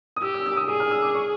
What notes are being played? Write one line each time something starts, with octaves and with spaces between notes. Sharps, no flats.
D#6
G4 E6
E6
E6
D#6
G#4 D#6
F6
E6
D6
C#6